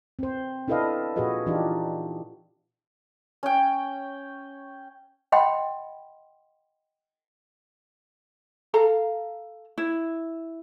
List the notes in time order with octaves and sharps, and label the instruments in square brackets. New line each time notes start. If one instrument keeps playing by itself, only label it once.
[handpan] C4 C5
D4 E4 A4 B4 D#5 F5
A#2 F4 F#4 G#4 B4 D#5
E3 D4 D#4 F4 G4
[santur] C#4 G5
[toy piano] D#5 F#5 G5 B5 C6
[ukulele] A4 F5 A#5
E4